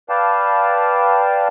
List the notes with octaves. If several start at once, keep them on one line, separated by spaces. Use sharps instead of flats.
B4 D5 F5 G5 A5